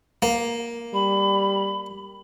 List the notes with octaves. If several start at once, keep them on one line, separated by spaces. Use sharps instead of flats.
A#3
G3 B5